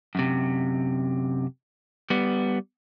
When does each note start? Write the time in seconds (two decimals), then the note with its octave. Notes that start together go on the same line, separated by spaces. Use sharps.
0.15 F#2 C3
2.10 G3 B3